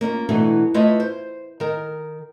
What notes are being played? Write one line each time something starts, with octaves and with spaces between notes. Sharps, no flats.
A#3 C#4 D#4 F4
B2 E3 F#3 A3 D4 F#4
A3 E4 F4 B4 C#5 D#5
C5
D#3 A#4